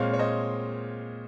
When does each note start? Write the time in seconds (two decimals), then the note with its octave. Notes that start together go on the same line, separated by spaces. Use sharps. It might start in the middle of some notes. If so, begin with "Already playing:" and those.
Already playing: A#2 G#3 C4 C#5 F5
0.13 C#5
0.19 C5 D#5